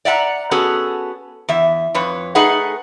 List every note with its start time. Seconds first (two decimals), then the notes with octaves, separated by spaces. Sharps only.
0.05 D5 E5 F#5 A5 A#5
0.51 B3 C#4 F#4 G#4 A4
1.49 E2 E5
1.95 F2 B4 C#5
2.35 A3 D#4 G#4 A4 B4 F#5